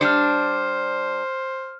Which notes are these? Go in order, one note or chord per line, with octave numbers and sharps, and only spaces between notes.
G3 D4 C5 F6 C#7